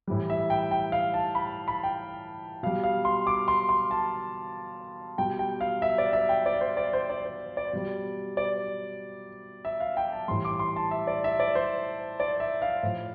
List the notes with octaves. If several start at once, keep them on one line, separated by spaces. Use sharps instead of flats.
A2 E3 G3
E5
G5
G5
F5
A5
B5
B5
G5
B2 G3 F5
F5
C6
D6
C6
C6
A5
B2 G3 G5
G5
F5
E5
D5
E5
G5
D5
C5
D5
C5
D5
C5
D5
B2 G3
D5
E5
F5
G5
A5
A2 E3 G3 C6
D6
C6
A5
E5
D5
E5
D5
C5
D5
E5
F5
A2 F3